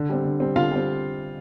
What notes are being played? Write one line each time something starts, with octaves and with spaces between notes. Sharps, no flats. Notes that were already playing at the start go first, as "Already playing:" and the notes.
Already playing: D3
G3 C4
D3
G3 C4
D3 F4 F5
G3 C4